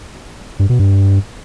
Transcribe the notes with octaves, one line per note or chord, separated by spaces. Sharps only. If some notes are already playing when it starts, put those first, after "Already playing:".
G2
B2
G2